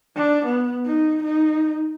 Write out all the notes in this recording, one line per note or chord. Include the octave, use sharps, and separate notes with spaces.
D4
B3
D#4
D#4